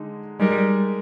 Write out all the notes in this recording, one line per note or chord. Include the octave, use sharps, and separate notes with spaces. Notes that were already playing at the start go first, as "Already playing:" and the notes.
Already playing: D3 G#3 D#4
G3 G#3 D#4 A#4